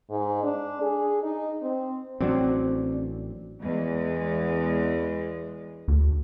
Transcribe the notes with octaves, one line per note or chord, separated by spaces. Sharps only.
G#2
D4
G#4
D#4
C4
A1 F#3 C4 D4 D5
E2 G#3
D2